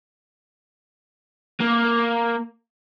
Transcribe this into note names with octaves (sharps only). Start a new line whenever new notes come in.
A#3